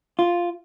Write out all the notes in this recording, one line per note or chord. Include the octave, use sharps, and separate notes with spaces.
F4